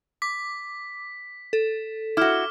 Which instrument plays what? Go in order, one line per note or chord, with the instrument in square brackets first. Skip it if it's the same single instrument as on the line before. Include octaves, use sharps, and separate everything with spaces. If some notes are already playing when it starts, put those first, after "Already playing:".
[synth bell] D6 [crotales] B6
[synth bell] A4
[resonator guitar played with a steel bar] E4 F#4 [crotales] D6 F6